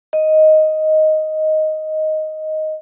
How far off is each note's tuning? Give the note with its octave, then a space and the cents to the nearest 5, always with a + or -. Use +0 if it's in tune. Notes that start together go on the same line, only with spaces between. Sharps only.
D#5 +5